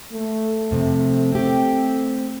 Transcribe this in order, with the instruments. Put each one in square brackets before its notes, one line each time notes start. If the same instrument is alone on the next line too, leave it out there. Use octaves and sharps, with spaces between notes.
[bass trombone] A3
[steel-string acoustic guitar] F2 C3
C4 G4